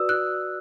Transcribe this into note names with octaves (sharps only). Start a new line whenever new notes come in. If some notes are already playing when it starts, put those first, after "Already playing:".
Already playing: F#4 B4 D5 D#6 E6
F#6